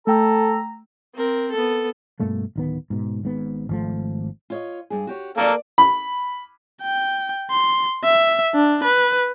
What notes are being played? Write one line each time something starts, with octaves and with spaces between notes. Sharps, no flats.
A3 A4 G5 A#5 E6
C4 A#4
B3 A4
G2 B2 A3 A#3
D1 D#3 B3
G#2 B2
G#1 G#2 B3
G#1 F3 A3
F4 C#5 D#5
G2 G#4
F#4 G4 C#5
A#3 A4 C#5 D5 F5
B5
G5
C6
E5
D4
B4